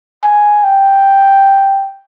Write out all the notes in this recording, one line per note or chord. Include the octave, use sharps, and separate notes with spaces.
G#5
G5